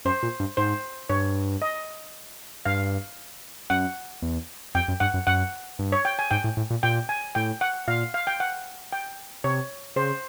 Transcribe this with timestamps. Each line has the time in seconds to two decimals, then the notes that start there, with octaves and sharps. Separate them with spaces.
0.05 F#2 C5
0.23 A#2
0.40 G2
0.57 G#2 C5
1.09 G2 C#5
1.62 D#5
2.65 G2 F5
3.70 F#2 F#5
4.22 E2
4.75 F2 G5
4.88 F#2
5.00 G2 F#5
5.14 F#2
5.27 F#2 F#5
5.79 G2
5.92 C#5
6.05 G5
6.19 G#5
6.31 G#2 G5
6.44 A2
6.57 A2
6.70 A#2
6.83 A#2 G5
7.09 G#5
7.35 A2 G5
7.61 F#5
7.88 A#2 F5
8.14 F5
8.27 G5
8.40 F#5
8.92 G5
9.44 C3 C#5
9.96 C#3 C5